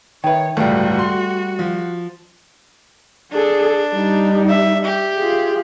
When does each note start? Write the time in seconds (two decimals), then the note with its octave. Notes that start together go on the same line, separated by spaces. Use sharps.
0.24 D#3 B4 C#5 E5 G5
0.57 G1 C#2 A2 G3 A3 F#4
0.99 C6
1.59 F3
3.32 D4 G#4 A4
3.93 G3 D#4
4.49 E5
4.85 G4
5.18 F4 G#4